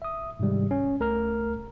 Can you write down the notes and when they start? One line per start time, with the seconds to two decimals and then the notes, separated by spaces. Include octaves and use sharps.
0.02 E5 D#6
0.39 G#2 C3 D#3 G3 G#3
0.71 C#4
1.00 C#2 A3 A#4 A#5 F6